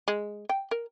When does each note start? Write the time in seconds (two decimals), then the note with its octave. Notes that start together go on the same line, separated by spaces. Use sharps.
0.08 G#3
0.49 G5
0.71 A#4